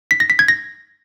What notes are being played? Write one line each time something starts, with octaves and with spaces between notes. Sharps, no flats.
B6
A#6
B6
G#6
A#6